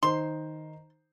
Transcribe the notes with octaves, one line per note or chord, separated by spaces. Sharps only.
D#3 D#4 C5 C6